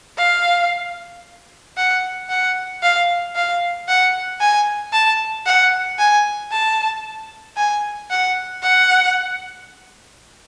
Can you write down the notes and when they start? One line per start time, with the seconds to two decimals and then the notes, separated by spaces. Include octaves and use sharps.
0.18 F5
1.77 F#5
2.30 F#5
2.82 F5
3.36 F5
3.88 F#5
4.41 G#5
4.93 A5
5.46 F#5
5.99 G#5
6.52 A5
7.57 G#5
8.10 F#5
8.63 F#5